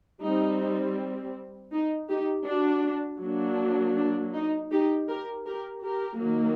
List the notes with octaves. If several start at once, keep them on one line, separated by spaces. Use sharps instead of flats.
G3 C4 D#4
D#4
D#4 G4
D4 F#4
F#3 A#3 D4
D4
D#4
D#4 G4
G4 A#4
G4 A#4
G4 A#4
D#3 F#3 A#3